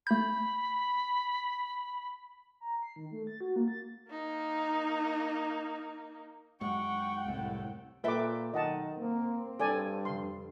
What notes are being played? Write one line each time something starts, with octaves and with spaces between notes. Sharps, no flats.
A3 B5 G6
A#5
C7
D#3
A3
A6
F#4
A#3
A6
A#3 D#4
F#2 G#3 F#5 G5 C#6
C2 A2 D3 A3
A#2 A4 B4 E5 G5 D6
B1 D#3 D#5 F#5 A5
A#3 C4
G2 A4 D5 G5 G#5
F2 D3 C6